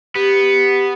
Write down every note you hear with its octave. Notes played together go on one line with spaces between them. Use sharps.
B3 G4